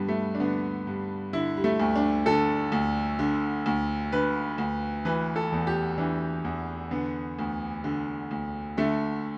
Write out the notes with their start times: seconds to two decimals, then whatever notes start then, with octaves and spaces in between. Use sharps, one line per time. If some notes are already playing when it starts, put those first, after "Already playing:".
Already playing: G2 D3 B3
0.09 A3
0.35 D4
0.40 D3 B3
0.87 G2
1.33 D3 E4
1.57 G3
1.64 A3
1.80 D2
1.96 D4
2.26 D3 A4
2.72 D2
3.19 D3
3.66 D2
4.12 D3 B4
4.58 D2
5.05 E3 B4
5.36 A4
5.52 E2
5.67 G4
5.98 E3 D4
6.44 E2
6.91 D3 B3
7.39 D2
7.84 D3
8.31 D2
8.77 D3 A3